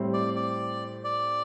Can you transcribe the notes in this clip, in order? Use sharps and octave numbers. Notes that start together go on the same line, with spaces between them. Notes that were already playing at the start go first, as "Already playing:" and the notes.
Already playing: A2 G3 C4 G4 C5
D5
D5
D5